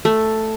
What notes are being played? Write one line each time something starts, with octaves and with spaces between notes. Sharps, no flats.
A3